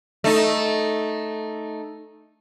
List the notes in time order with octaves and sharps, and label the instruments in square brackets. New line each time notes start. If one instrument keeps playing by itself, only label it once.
[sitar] A3 D#4